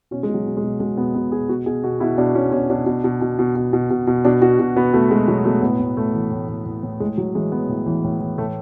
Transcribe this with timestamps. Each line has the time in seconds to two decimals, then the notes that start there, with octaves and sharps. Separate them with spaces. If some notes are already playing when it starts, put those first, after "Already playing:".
0.11 B2 C#4
0.23 G#3
0.29 B2
0.34 F#3
0.46 B2
0.57 G#3
0.63 B2
0.80 B2 G#3
0.97 B2 B3
1.14 B2 B3
1.32 B2 G#4
1.49 B2 F#4
1.66 B2 G#4
1.84 B2 F#4
2.00 B2 E4
2.18 B2 D4
2.35 B2 C#4
2.52 B2 C#4
2.70 B2 D4
2.86 B2
3.04 B2
3.21 B2
3.39 B2
3.56 B2
3.73 B2
3.90 B2
4.07 B2
4.25 B2 D4
4.42 B2 F#4
4.59 B2
4.76 B2 B3
4.93 B2 A3
5.11 B2 G#3
5.28 B2 F#3
5.45 B2 A3
5.62 A2 B3
5.80 A2
5.97 A2 A3
6.14 E3
6.31 A2
6.49 A2
6.66 A2
6.83 A2
7.00 A2 G#3
7.18 A2 F#3
7.35 E3 G#3
7.52 E3 B3
7.69 A2
7.86 E3
8.04 A2
8.21 E3
8.38 A2 A3